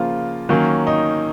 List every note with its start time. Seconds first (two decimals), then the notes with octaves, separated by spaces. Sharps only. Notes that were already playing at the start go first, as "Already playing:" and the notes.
Already playing: C#3 F3 A#3 F4
0.49 D#3 F#3 A#3 C#4
0.87 D#4